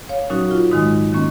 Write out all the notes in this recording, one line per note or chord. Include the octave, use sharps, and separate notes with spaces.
C#5 F5
A#2 F#3 C#4 D#4 F#4
F4
G#2 D#3 G#3 D#4
D#3 A#3 C#4